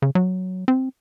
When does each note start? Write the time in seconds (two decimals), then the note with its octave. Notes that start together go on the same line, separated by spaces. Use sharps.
0.02 C#3
0.15 F#3
0.68 C4